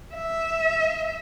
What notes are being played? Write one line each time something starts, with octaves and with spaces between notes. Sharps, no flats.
E5